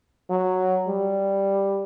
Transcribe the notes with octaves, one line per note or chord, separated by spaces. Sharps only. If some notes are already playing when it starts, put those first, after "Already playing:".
F#3
G3